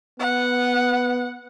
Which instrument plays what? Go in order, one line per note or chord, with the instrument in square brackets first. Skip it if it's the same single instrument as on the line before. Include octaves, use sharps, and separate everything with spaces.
[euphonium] B3 [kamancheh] F#5